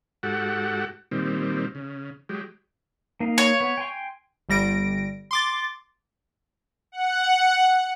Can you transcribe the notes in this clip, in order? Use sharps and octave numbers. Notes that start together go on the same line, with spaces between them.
G#2 F#4 G4 A4 F#5
A#2 D#3 G3 C4
C#3
F#3 G#3 G4
A#3 D#4 F5
C#5
B3
G5 G#5 C6
G1 G3 A#6 D7
C6 D6 A6
F#5